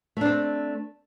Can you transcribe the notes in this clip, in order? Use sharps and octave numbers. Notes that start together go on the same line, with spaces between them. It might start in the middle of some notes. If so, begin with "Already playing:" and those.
A3 C4 D4